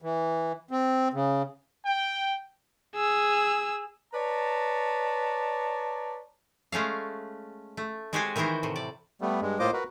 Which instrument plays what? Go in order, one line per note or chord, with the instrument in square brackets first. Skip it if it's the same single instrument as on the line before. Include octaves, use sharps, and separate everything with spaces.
[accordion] E3
C4
C#3
[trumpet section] G5
[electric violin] G#4 E6
[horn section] B4 C#5 D5 A5 A#5
[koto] G#3 A3 C#4 F5
A3
G#3 C4 F#4 G4 C#5 G#5
D#3 E3 E4 F#4 A#4 C5
A2 C3
D5
[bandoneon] G3 A3 B3
G2 G#3
A2 A#3 F4 C5 D#5 D6
F#4 A#4 B4